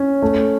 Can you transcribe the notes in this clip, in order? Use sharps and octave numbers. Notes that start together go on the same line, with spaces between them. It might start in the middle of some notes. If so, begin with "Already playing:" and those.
Already playing: C#4 C#5
A3